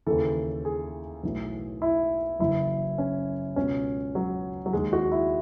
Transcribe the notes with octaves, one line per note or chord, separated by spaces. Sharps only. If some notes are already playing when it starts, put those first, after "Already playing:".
D#2 C#3 E3 A4
G#4
B1 A2 E3
E4
F#1 F#2 E3 E4
C#4
C#2 B2 C#4
F#3
F#3
D#2 D#3 G#3
F#4
E4